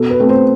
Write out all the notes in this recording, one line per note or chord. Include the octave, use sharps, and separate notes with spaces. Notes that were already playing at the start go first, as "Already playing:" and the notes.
Already playing: B2 A4
B4
A3 C4
C5